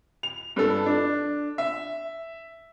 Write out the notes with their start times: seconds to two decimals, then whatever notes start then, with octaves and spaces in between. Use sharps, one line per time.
0.23 F7
0.56 G2 A4
0.86 D4
1.58 E5